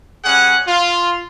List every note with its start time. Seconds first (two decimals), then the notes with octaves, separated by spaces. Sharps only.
0.24 G3 C#4 G#4 F#5
0.67 F4